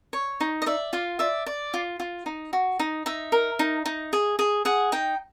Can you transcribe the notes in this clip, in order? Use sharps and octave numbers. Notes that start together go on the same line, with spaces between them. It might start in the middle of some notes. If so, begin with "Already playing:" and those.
C#5
D#4
D#5
D5 E5
F4 F5
D5 E5
D5
F4
F4
D#4
F#4
D#4
D#4 E5
A#4
D#4
D#4
G#4
G#4
G#4 F#5
D#4 G5